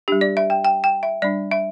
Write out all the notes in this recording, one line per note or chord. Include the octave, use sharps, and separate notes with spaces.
G3 D4 G4
D5
E5
G5
G5
G5
E5
G3 D4 D5
E5